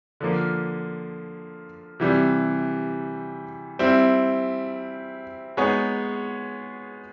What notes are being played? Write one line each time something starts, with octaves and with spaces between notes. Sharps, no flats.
D3 F3 A#3
C3 E3 G3
G3 C4 E4
G#3 B3 D#4 G#4 C#5